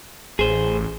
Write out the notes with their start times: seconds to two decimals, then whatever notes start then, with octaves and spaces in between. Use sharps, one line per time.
0.39 A1 G#4 C5